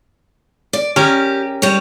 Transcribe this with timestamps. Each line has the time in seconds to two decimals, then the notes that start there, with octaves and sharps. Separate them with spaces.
0.73 D5
0.96 C#4 G4 A#4
1.62 G3 C#5